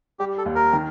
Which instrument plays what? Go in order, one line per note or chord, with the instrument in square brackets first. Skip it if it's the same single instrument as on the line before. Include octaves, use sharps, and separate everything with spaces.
[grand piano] G3 [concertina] G4
[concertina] A4
[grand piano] D#2
[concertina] A#4
[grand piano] D#3